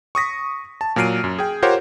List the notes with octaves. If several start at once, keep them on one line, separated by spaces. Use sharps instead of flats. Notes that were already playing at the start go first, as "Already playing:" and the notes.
C#6 D#6 A#6 B6
A5
A#2 F#3 F6 C7 D7 D#7
F#2
G#4 G5
F4 G4 A#4 C5 C#5 F#5